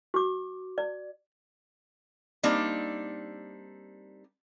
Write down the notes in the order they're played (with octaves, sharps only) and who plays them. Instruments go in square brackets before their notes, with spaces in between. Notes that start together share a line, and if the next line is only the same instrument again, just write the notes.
[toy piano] F#4 D6
D5
[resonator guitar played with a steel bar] G3 A#3 C4 D4 D#4